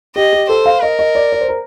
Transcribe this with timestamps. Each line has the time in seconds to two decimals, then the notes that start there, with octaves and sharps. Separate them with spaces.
0.15 G4 D#5
0.33 G4
0.49 A4 C5
0.66 F5
0.82 A#4 D#5
0.99 D#5
1.15 D5
1.32 D5
1.41 C5
1.48 A#4